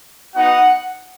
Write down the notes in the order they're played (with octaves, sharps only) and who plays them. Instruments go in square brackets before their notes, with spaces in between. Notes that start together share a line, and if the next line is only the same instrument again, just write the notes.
[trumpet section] B3 D#4 F#4 F#5